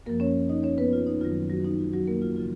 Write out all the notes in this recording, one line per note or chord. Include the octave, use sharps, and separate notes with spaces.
F#2 F3 A#3 A#4
C#4 C#5
D#4 D#5
C#4 C#5
B3 B4
F4
D#4
F#2 D#3 F#3 F4
F#3 F#4
D#4
F4
F#3 F#4
A#3 A#4
F4
C#3 F3 F4